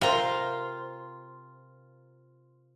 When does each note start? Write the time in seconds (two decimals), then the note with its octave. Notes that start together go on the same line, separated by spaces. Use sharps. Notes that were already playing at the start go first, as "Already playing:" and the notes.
0.01 C3 F4 A#4 C5 A#5